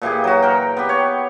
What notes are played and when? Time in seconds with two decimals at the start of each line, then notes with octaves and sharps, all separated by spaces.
0.02 A#2 E3 G4 G#4
0.24 F#3 F#4
0.42 A#4 G5
0.77 B3 G4
0.89 C#5